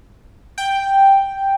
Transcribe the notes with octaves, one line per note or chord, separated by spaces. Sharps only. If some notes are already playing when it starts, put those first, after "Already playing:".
G5